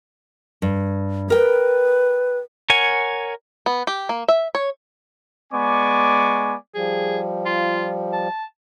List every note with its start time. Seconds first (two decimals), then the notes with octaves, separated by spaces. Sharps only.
0.62 G2
1.30 A#4 B4 G5
2.70 A#4 C#5 F#5 G#5
3.66 B3
3.87 G4
4.09 A#3
4.28 E5
4.55 C#5
5.53 G#3 B3 D5 G#5 C#6 D6
6.75 F3 G3 G#4
7.45 F4
8.13 A5